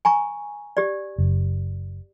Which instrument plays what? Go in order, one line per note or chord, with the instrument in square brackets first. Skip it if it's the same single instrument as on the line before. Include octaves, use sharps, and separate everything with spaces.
[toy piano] G#5 A#5 C#6
G4 D5
[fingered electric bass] F#1